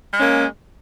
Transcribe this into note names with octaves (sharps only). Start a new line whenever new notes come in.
G#3 A#3 C#4